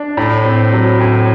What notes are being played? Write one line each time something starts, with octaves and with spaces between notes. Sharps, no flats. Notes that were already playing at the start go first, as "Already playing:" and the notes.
Already playing: D4
A2
C4
F#3
A2